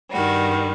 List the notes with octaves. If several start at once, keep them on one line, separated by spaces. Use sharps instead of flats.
G2 D#3 G3 F#4